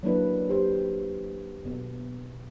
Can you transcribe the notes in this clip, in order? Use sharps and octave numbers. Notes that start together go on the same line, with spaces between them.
F#3 A#3 D4 E4 B4
G4 C5
B2